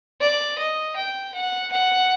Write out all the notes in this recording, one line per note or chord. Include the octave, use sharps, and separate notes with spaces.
D5
D#5
G5
F#5
F#5